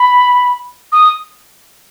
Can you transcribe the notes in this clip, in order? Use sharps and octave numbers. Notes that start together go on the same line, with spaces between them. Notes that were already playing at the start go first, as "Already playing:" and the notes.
Already playing: B5
D#6